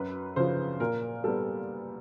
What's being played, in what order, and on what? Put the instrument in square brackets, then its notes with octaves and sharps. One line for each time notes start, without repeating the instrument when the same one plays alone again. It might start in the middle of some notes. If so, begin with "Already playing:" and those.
Already playing: [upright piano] F#2 B4
C#3 F3 C5
A#2 A#4
G3 B3 A4